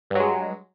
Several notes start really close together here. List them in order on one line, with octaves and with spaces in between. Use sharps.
G2 F#3 G#3